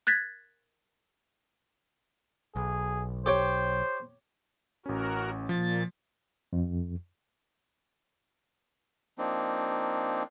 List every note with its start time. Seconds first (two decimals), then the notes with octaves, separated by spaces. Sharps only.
0.07 F#6 G#6 A6 B6
2.56 B1 G#4
3.26 G4 C5 C#5 G5
4.86 A1 C#4 F#4 A#4
5.49 A#2 F3 A6
6.53 F2
9.18 F3 A#3 C4 D4 D#4